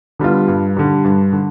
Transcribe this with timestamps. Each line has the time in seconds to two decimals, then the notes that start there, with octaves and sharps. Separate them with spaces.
0.19 D3 G3 B3 F4
0.48 G2
0.77 D3 G3
1.04 G2
1.33 D3